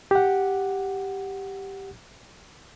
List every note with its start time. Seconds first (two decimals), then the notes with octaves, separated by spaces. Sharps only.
0.11 G4 F#5